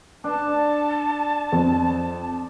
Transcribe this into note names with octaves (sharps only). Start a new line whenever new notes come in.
D4 A5
F2